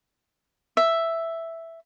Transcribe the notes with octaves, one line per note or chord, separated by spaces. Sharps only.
E5